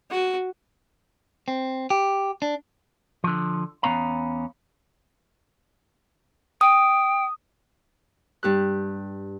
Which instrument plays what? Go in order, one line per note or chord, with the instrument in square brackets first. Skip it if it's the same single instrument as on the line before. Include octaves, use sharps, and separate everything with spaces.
[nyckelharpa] F#4
[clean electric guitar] C4
G4
D4
D3 F3
E2 F3 B3 C#4 F5 A#5
[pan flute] G5 [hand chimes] D#6
[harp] G2 G4 F#6